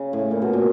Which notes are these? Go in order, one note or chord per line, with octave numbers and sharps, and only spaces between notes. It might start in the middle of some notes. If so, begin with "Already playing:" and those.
Already playing: C#3
A2
A#2
B2
A#2